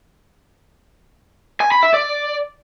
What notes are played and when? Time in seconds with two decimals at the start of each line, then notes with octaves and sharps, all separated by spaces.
1.61 G#5
1.72 B5
1.83 E5
1.94 D5